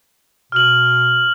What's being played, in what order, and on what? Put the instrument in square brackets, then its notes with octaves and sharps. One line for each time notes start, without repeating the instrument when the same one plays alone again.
[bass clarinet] B2 [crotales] F6 F#7